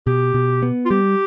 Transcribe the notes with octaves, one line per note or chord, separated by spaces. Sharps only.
B2 G4
B2
B3
F4
G3 G4